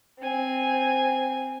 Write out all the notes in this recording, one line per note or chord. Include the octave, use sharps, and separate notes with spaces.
C4 G#5